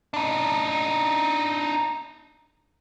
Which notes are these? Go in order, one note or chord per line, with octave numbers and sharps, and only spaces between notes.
D4 D#4